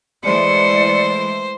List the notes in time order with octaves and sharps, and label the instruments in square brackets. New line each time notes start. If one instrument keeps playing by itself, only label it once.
[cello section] E3 G#3 A3 [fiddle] C5 [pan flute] D5 [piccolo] C#7